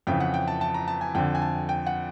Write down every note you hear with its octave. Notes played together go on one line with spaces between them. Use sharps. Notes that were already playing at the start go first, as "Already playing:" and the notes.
F2 C#3 E3 G5
F#5
G5
A5
A5
A#5
A5
G#5
F2 D3 G5
G#5
A5
G5
F#5